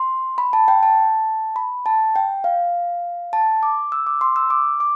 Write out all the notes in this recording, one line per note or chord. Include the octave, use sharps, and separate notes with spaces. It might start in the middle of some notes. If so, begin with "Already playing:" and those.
Already playing: C6
B5
A5
G5
A5
B5
A5
G5
F5
A5
D6
E6
D6
C6
E6
D6
D6